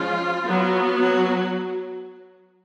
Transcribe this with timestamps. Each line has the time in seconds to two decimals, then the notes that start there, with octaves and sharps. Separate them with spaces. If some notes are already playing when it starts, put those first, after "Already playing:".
Already playing: F3 G#3 C#4 F4
0.47 F#3 B3
0.99 F#3 F#4